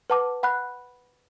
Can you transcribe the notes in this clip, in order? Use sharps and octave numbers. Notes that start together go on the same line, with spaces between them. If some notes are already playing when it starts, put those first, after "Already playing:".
B4 F#5 A5 D6
F#5 B5 F#6